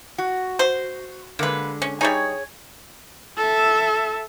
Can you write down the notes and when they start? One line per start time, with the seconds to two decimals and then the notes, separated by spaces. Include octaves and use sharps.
0.18 F#4
0.59 C5
1.39 D3 G#3 A#3 B4
1.82 C#4
2.01 G3 D#4 G#4 C#5 G#5
3.37 A4 E5